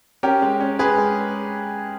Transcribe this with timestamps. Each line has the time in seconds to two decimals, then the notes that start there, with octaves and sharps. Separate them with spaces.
0.23 C#4 G4 A#4
0.42 G#3
0.61 C#4
0.79 G#3 G#4 B4
0.98 G#3